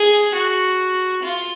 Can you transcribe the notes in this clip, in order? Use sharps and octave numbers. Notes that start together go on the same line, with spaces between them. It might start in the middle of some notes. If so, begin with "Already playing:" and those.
Already playing: G#4
F#4
F4